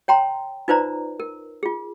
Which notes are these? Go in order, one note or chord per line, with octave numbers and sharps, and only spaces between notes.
C#5 G5 A#5 C6
D#4 F4 B4 C5 D5 A#5
A#4
F4 G#4